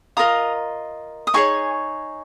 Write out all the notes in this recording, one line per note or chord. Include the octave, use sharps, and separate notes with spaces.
F4 A#4 D#5 A#5 D#6
D#6
D#4 G#4 C#5 G#5 C#6